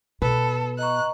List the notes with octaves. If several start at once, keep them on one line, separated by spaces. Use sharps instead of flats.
B2 A4 B4
D#5 A#5 C#6 F#6